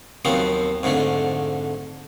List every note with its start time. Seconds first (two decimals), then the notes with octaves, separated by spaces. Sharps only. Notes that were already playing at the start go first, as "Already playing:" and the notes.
0.25 D#2 F3 F#3 B3 C4
0.83 F2 G#2 D3 A3